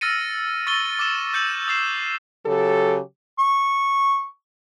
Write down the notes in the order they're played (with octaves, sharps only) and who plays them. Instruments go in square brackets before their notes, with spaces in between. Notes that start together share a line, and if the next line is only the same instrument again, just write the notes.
[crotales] E6 F6 A6 A#6 C#7 D#7
C#6 E6 A6 A#6 D#7 G7
D6 E6 E7 G7
E6 G6 C#7 F#7
D#6 A6 C7 E7
[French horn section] C#3 F#3 G4 A4
[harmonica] C#6